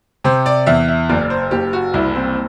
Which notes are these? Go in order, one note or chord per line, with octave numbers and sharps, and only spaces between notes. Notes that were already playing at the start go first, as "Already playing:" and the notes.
C3 C5
D5
E2 E5
E5
F#1 D5
C5
F#1 G4
F#4
C2 E4
C4